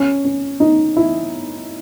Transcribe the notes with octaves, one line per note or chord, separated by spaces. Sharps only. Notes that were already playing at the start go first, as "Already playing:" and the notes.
Already playing: C#4
C#4
D#4
E4